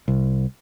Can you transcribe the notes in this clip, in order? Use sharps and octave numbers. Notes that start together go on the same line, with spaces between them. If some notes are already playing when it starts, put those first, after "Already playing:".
C2